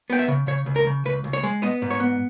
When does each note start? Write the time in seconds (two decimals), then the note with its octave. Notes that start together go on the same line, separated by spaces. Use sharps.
0.10 B3 G5
0.19 E5
0.28 C#3
0.47 C#3 C#5
0.66 C#2
0.76 A#4
0.86 C#3
1.05 C#2 B4
1.24 C#2
1.33 C#5
1.43 G#3
1.62 B3 D#5
1.82 G#2
1.91 C#5
2.00 B3